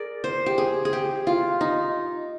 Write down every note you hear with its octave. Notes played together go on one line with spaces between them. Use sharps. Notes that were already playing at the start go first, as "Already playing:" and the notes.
Already playing: G#4 A#4 D5
C5
G4
G#4
G#4
G4
F4
D#4